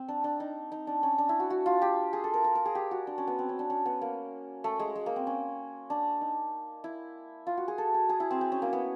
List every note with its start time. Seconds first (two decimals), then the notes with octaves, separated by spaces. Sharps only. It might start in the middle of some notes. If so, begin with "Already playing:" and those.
Already playing: C4
0.08 D4
0.24 D4
0.40 D#4
0.72 D#4
0.87 D4
1.03 C#4
1.18 D4
1.29 E4
1.40 F#4
1.50 F#4
1.66 F4
1.82 G4
2.13 G#4
2.24 A4
2.34 A#4
2.44 A#4
2.55 A#4
2.65 G#4
2.75 G4
2.91 F#4
3.07 D4
3.18 C#4
3.27 B3
3.39 C4
3.49 C#4
3.59 D4
3.70 C#4
3.86 B3
4.01 A#3
4.64 A3
4.79 G#3
4.95 G#3
5.06 A#3
5.16 C4
5.27 C#4
5.90 D4
6.21 D#4
6.84 E4
7.47 F4
7.57 F#4
7.68 G#4
7.78 A4
7.94 G#4
8.09 G#4
8.20 E4
8.31 C4
8.41 C4
8.52 C#4
8.62 A#3
8.73 B3